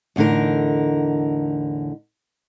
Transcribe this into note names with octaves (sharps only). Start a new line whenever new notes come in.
E2 A2 D3 D#4 A#4